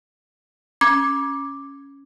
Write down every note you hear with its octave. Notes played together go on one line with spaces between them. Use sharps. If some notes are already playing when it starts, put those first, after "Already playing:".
C#4 D6 G#6